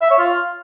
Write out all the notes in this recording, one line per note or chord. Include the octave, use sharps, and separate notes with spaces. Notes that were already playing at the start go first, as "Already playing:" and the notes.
E5
C#5
F4